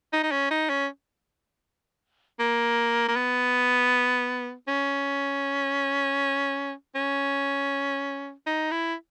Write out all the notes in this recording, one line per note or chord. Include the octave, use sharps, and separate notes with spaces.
D#4
D#4
C#4
D#4
C#4
A#3
A#3
B3
C#4
C#4
D#4
E4